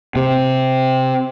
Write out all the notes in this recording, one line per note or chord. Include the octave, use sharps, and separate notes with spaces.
C3